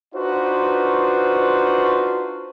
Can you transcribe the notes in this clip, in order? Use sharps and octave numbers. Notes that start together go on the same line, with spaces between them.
D4 D#4 F4 F#4 B4 C5